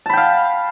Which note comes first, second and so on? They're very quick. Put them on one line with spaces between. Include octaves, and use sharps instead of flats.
A5 B5 G5 F5